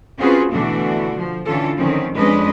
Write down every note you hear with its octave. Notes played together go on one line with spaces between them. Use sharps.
C4 C#4 F4 F#4 G#4 B4
B2 D3 E3 A3 D4 F#4
F3
D3 E3 C#4 F4 A4
D3 D#3 F3 C4 C#4
F2 G#3 C#4 D4 B4 D#5